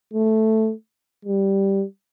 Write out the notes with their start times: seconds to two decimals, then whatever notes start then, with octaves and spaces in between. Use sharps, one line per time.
0.14 A3
1.26 G3